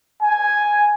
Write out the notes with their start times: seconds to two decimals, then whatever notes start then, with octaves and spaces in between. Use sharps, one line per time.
0.22 G#5